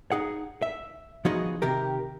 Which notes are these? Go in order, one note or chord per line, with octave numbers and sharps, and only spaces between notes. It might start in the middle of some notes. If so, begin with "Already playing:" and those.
D#4 G#4 F#5
E5
F3 B3 D#4 F#4 G#4 D#5
C3 D#3 G4 A#4